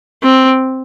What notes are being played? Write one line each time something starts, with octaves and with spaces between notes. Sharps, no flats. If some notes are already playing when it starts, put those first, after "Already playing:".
C4